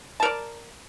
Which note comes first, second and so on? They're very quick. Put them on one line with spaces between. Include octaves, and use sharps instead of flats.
A5 A#4 D5